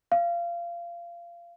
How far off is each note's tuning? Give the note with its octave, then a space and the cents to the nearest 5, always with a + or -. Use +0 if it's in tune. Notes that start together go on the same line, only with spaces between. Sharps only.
F5 -25